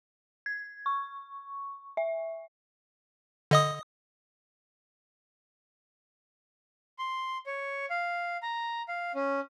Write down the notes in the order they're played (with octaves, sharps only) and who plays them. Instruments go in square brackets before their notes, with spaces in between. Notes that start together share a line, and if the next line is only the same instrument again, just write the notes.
[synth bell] G#6
C#6
E5
[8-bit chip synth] D3 D#5 D#6
[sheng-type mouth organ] C6
C#5
F5
A#5
F5
C#4